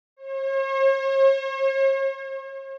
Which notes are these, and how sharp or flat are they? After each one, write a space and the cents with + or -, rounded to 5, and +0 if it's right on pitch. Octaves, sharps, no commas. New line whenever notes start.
C#5 -45